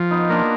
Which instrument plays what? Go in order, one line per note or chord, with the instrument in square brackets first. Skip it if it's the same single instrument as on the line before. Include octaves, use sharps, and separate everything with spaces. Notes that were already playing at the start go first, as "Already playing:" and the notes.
Already playing: [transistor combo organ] F3
[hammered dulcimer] B3 D#4
[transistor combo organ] A#3 [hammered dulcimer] D4 F4